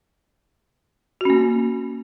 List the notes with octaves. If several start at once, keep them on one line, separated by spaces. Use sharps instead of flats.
A#3 C#4 F#4